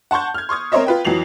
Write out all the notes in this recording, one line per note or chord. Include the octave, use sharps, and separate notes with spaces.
F#5 A5 C6 C#6 G6
F6 G#6
C6 C#6 D#6 G#6
C4 A#4 C5 C#5 D#5 E5
F4 B4 G5
F2 E3 F#3 C7 F7 F#7